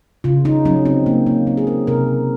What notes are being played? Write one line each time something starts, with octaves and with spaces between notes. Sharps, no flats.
C#3 F4
D#4
F#3 C#4
C4
A#3
A#3
C#3 C4
G#4
A#4
C3 A#4